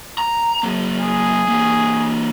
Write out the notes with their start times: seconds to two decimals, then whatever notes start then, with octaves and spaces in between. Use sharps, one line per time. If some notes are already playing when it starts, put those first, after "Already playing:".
0.18 A#5
0.63 F#3 A#3
1.00 G#4
1.48 E3 A#3